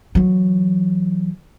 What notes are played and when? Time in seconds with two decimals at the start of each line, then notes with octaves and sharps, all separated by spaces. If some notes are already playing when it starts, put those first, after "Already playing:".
0.15 E3 F#3